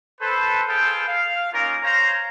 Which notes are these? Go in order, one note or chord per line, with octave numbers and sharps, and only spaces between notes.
A4 B4 C5
G#4 A4 B4 C5 F5 G5
F5
A#3 C#4 D#4 F4 A#4
C5 C#5 F5 A#5